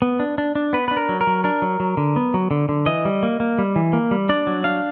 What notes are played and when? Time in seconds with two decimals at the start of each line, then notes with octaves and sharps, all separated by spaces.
0.02 B3
0.20 D4
0.38 D4
0.55 D4
0.73 B3 B4
0.88 D4 B4
0.97 A#4
1.09 F#3
1.21 A#4
1.27 F#3
1.44 D4 A#4
1.62 F#3
1.80 F#3
1.97 D3
2.16 B3
2.34 F#3
2.51 D3
2.69 D3
2.86 E3 D#5
3.05 G3
3.23 A#3
3.40 A#3
3.58 G3
3.76 E3
3.93 A#3
4.11 G3
4.29 D4 D5
4.47 F#3
4.64 D4 F5